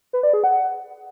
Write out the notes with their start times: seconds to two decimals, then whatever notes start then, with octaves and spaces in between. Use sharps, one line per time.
0.13 B4
0.23 D5
0.33 G#4
0.44 F#5